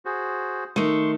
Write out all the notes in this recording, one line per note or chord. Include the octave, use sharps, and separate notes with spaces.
F#4 G#4 C5
D#3 A3 C6 C#6